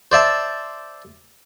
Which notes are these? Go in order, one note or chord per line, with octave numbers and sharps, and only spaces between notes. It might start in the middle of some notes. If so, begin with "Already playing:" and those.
C5 D5 E5 A5